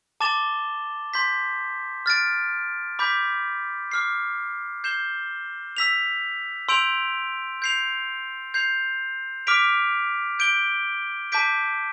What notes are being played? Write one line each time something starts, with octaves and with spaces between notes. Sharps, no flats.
A5 D6 A6 E7 G7
C6 G6 B6
F6 A6 D7
B5 D6 G6 B6
D6 F6 C7
G6 C7 E7 G7
E6 B6 F7
C6 E6 G6 D7 F7
G6 C7 F7
G6 C7 F7
D6 F6 B6 D7 F7
G6 D7 G7
A5 D6 G6 B6 D7